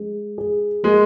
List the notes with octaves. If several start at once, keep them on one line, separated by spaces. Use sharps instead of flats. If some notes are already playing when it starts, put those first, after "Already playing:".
Already playing: G#3
G#4
G#3 A#3